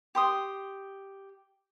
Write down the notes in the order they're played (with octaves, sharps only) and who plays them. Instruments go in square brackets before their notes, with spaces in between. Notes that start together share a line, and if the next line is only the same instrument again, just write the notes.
[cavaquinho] G4 C6 D#6